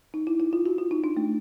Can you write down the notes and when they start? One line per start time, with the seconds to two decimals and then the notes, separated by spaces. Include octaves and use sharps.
0.14 D#4
0.27 E4
0.40 E4
0.53 F4
0.66 F#4
0.78 F4
0.91 D#4
1.04 D4
1.17 A3